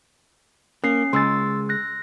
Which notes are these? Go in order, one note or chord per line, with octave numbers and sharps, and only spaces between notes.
A#3 C#4 C7
C#3 G#3 C6 E6 A6
F#6 A#6